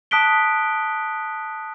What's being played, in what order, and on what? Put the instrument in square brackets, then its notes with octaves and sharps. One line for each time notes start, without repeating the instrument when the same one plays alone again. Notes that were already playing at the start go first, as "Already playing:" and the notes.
[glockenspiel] A5 D#6 F#6 B6 D7 G7